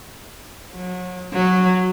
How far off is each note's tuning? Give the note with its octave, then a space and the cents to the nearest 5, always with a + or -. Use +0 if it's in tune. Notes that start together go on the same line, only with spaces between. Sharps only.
F#3 -30
F#3 -10